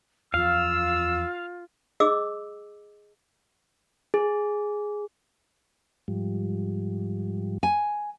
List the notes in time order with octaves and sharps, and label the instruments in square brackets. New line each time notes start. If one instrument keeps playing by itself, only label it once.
[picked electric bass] E2 F3 [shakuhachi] F4 [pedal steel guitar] F5 [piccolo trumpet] E6
[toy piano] G#4 D#5 D6 E6
[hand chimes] G#4
[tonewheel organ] G#2 F3 G3
[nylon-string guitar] G#5